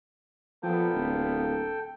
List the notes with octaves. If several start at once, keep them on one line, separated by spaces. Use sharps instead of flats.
A#2 F3 A#3 B3 A4 G5
D1